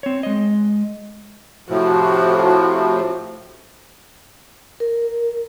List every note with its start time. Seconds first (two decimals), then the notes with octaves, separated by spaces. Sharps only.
0.03 C4 C#5
0.23 G#3 D#5
1.69 A2 C3 F3 F#4
4.80 A#4